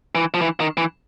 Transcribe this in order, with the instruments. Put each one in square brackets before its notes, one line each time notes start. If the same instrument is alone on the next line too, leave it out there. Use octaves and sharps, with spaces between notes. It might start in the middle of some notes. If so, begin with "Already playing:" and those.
[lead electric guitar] E3
F3
E3
D#3
E3